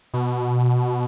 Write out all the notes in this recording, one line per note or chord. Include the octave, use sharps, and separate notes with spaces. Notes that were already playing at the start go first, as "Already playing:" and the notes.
B2